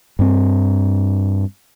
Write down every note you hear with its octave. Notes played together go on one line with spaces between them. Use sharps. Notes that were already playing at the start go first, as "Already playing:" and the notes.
G2 C4